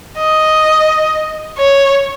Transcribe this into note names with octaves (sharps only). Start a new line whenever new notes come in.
D#5
C#5